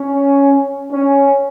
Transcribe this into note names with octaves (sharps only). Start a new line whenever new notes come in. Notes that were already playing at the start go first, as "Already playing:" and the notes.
Already playing: C#4
C#4